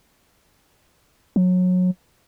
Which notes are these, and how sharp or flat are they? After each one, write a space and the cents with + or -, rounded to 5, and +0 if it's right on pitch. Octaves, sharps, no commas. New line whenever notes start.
F#3 -25